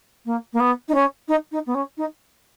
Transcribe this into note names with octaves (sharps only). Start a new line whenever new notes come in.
A#3
A#3
B3
D#4
C#4
D#4
D#4
B3
C#4
D#4